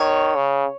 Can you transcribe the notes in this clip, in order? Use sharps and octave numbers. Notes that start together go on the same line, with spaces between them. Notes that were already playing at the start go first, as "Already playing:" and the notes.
Already playing: D#3 C#5
C#3